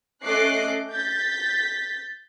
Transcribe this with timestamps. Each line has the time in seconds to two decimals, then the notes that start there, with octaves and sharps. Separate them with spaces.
0.23 A3 C#4 D#5 D6 F#6 C7
0.91 G6 A6 B6